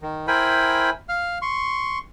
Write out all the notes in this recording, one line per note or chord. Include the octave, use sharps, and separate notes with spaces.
D#3
E4 A#4 C5 G5 G#5 B5
F5 F6
C6 C#6